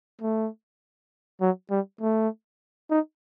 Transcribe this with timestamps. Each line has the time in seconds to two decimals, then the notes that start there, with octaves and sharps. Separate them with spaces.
0.22 A3
1.41 F#3
1.71 G3
2.01 A3
2.90 D#4